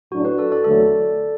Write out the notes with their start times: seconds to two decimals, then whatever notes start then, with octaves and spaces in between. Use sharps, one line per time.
0.12 A2 F#3 D4 F#4
0.25 F#4 B4
0.38 A4 D5
0.52 A4 D5
0.64 E2 D3 F#3 A3 A4 D5